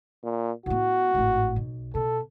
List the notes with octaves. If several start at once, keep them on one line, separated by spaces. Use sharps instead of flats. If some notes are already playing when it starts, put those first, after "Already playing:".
A#2
A2 B3 F#4
G#1 A2
B1
B2 A4